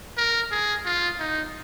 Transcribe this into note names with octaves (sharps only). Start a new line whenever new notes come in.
A#4
G#4
F4
D#4